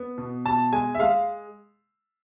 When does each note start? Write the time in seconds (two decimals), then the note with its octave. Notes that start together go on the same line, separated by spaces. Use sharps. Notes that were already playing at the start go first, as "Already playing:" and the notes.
Already playing: B3
0.18 B2
0.45 B2 A5
0.72 G#3 G#5
0.95 E5
1.00 G#3 F5